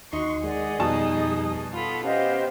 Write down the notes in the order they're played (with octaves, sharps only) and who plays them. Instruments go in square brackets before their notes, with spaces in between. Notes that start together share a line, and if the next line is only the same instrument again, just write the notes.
[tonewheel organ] D#2 C6 [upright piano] D#4 [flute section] F#4 [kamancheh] C#6
[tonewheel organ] D#3 G#3 [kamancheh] G#4 D#5 [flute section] D5 F#5
[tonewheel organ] F2 G3 [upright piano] B2 A5 [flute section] D#4 D#6
[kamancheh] F4 A4 [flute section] F#5 B5
[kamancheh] B3 C5 [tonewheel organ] C#4 [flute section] G4 D#5 F5